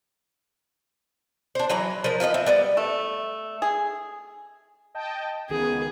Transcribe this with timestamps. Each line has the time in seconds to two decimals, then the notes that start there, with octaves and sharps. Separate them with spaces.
1.55 D4 C5
1.69 E3 F#3 B4 A#5
2.04 F3 A#4
2.20 F4 B4 C5 D#5
2.34 C4 E5
2.46 G3 B3 D5
2.77 A3
3.62 G#4
4.95 D#5 G5 A5
5.49 C#2 D#3 B3 G#4